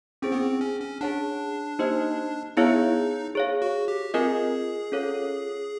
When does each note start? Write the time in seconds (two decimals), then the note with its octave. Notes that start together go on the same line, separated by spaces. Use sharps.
0.22 C4 C#4 E4 G#4 C5
0.32 B3
0.41 C4
0.61 C#4
0.81 C#4
1.01 D4 G#4 C#5 F#5 A5
1.79 A#3 D#4 G4 C5 D#5
2.57 B3 D#4 E4 G#4 C#5 F5
3.35 G#4 C#5 F5
3.62 F#4
3.88 G4
4.14 C4 F4 G#4 A#4 D#5 G#5
4.92 C#4 F4 A4 C#5 F5